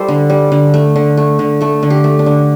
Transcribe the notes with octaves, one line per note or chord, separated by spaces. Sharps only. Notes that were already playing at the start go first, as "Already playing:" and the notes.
Already playing: G3 E4 G4 A4 C5
D3
G3
D3
A3
D3
A3
D3
A3 A4
D3
G4
A3
D4
D3